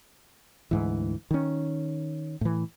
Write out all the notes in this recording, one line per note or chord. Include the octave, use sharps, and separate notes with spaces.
D2 G#2 E3
D#3 C#4
A2 E3